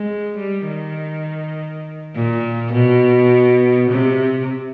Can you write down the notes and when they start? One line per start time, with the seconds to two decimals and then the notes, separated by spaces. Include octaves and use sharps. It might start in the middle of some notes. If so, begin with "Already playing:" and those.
Already playing: G#3
0.38 G3
0.68 D#3
2.15 A#2
2.73 B2
3.91 C3